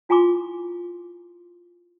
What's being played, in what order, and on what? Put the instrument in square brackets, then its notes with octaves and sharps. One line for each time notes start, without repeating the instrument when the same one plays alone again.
[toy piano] E4 F4 G#5 A#5 C6 D6